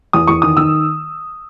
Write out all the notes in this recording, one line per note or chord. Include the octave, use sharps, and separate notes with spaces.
E2 D#6
E2 C#6
D#3 D#6
D#3 E6